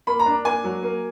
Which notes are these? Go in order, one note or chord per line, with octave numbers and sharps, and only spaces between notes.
A#3 B5
A#5
D4
A#3 G#5
F#3
A#3